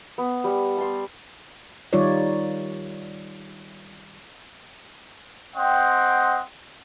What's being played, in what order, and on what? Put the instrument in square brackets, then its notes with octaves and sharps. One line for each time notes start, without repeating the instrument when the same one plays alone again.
[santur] B3
G3
A5 C6
[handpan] D#3 G3 D#4 F4 C#5 D5
[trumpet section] C4 D#5 F#5 G5 C6